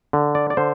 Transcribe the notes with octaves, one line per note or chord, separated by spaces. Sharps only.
D3
D5
D5
D3 C5